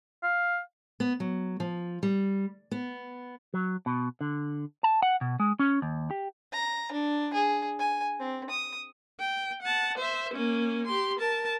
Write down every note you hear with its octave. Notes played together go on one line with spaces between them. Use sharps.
F5
B3
F#3
F3
G3
B3
F#3
B2
D3
A5
F#5
B2
G#3
C#4
D#2
G4
A#5
D4
G#4
G#5
C4
D#6
G5
F#5 A5
C5 E5
A#3 C#4
G4 C6
A#4 A5